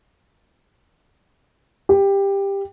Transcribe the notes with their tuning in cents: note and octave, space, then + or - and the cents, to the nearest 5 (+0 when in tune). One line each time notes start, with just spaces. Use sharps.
G4 +15